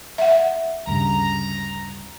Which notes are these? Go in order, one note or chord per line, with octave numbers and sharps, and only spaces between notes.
E5 F#5
D2 G2 C#3 A#5